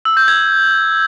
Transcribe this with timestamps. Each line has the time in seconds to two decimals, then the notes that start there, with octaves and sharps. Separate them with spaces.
0.05 E6
0.17 G6
0.28 G#6